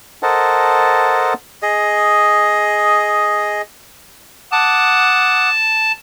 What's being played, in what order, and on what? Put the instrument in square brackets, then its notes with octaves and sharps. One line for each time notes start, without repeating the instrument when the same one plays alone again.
[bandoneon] A4 A#4 C5 D#5 F#5 A5
[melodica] G#4 D#5
[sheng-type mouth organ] F#5 D6 D#6 [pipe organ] A5